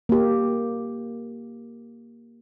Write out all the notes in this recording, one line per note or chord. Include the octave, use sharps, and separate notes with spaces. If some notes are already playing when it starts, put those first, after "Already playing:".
A#3 G4